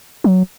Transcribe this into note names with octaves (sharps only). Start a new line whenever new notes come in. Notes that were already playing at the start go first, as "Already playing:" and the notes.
F#3